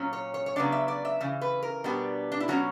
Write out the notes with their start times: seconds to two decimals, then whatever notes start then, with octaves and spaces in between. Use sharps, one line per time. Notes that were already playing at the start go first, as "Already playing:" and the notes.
Already playing: A#2 F#3 C#4
0.13 C#5
0.34 C#5
0.46 C#5
0.56 C#3 F#3 B3 D4 D5
0.72 E5
0.88 D5
1.05 E5
1.21 C#3 E3
1.41 B4
1.63 A#4
1.84 B2 G3 B3 D4
2.32 D4
2.40 E4
2.48 B2 F#3 C#4 F#4